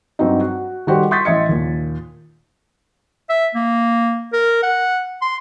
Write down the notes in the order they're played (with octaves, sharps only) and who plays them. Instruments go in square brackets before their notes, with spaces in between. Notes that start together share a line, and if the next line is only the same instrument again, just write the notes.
[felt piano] G2 F#3 C4 D#4
F#4
D#3 G3 F#4 G4 A4 C5
C6 C#6 D#6 G6 A6 B6
A1 D#5 E5 C6 G#6 C#7
D#2 A#2
[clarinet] E5
A#3
A#4
F#5
C6